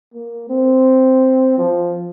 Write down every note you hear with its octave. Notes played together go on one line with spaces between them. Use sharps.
A#3
C4
F3